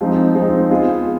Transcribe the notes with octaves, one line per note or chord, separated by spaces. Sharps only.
F3 G#3 C4 D#4
F3 G#3 C4 D#4
B3 F4 G#4